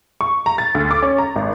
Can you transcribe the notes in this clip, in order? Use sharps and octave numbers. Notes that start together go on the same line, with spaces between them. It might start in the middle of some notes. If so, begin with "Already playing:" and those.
C#6
A#5
A6
D2
D6
C#4
A#5
G#1